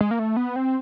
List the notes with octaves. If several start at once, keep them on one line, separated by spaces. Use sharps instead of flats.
G#3
A#3
A3
B3
C4